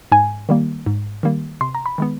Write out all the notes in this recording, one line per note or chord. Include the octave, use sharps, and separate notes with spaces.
G#2 G#5
D#3 G3 A#3
G#2
D#3 G3 A#3
C3 C6
A#5
B5
D#3 G#3 B3